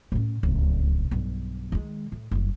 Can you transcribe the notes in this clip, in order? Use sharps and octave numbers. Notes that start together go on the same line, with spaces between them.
A2 C#4
D1 C#2
B1 G2
D#3 G#3
A2
F#1 G2